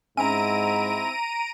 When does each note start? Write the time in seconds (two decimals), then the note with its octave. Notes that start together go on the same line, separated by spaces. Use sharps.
0.17 G#2 C4 C#4 E4 E5 A#5 D7 D#7